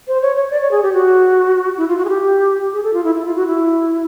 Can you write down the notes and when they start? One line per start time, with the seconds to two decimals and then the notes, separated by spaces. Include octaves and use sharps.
0.08 C5
0.22 C#5
0.36 C#5
0.51 D5
0.61 C#5
0.71 G#4
0.83 G4
0.93 F#4
1.77 E4
1.88 F4
1.99 F#4
2.05 G#4
2.09 G4
2.73 G#4
2.83 A4
2.94 F4
3.04 E4
3.15 E4
3.25 F4
3.36 F#4
3.47 E4